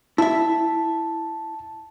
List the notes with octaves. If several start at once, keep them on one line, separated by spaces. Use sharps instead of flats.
E4 E5 A5